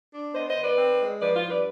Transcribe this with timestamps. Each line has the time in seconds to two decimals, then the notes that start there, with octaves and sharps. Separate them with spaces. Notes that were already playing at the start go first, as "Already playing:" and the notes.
0.14 D4
0.34 B3 C5 D#5
0.49 C5 D#5
0.56 D#3
0.63 B4 D5
0.78 C4
1.01 G#3
1.22 F3 B4 D5
1.36 F4
1.44 G2
1.50 B4 D5